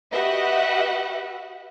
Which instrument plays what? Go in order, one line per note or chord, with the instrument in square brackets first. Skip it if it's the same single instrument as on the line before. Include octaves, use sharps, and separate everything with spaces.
[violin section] F#4 G4 B4 D#5 E5 F#5